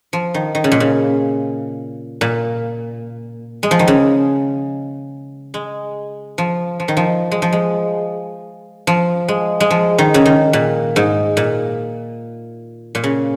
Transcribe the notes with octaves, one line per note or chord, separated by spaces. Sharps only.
F3
D#3
D#3
C#3
A#2
C#3
A#2
G#3
F3
D#3
C#3
G#3
F3
F3
D#3
F3
G#3
F3
G#3
F3
G#3
G#3
F3
D#3
C#3
D#3
A#2
G#2
A#2
A#2
C#3